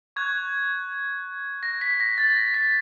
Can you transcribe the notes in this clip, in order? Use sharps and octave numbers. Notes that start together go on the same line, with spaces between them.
C#6 F#6 G#6
A#6
B6
A#6
A6
A#6
B6